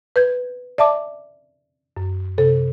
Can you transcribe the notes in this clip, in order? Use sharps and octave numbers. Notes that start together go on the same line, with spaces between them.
B4 G6 G#6
D5 E5 A5 D6
F#2
C3 A4